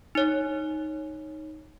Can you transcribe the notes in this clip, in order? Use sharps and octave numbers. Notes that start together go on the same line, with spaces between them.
D#4 C#5